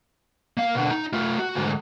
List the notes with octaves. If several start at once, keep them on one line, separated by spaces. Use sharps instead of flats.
A#3 F5
B2 D3
D#4
A3 F4
F#4
D2 G#2